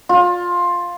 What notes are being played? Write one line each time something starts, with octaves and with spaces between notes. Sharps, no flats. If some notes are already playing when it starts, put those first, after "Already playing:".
F4